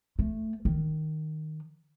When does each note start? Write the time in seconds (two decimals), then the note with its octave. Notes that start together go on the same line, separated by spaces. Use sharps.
0.19 A3
0.65 D#3